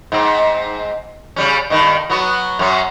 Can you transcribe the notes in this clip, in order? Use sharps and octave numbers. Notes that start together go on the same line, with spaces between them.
G#2 C4
C#3 G3 C#4
G2 D#3
F#3 B3 F#4
F#2 C#4